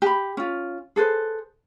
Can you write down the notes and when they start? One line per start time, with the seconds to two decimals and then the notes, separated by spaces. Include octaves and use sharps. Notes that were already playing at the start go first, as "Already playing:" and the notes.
0.02 G4 B5
0.37 C#4 F4
0.96 G#4 A4 B4 C5